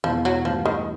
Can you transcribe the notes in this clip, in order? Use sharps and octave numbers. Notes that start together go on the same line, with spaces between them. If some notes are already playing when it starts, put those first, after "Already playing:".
E2 B2 F3 G#3 B3 E4
F#3
G2 E3 F3 A3
D#3